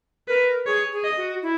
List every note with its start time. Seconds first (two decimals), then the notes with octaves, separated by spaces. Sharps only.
0.28 A#4 B4
0.66 G#4 C#5
0.92 G#4
1.04 D#5
1.17 F#4
1.43 E4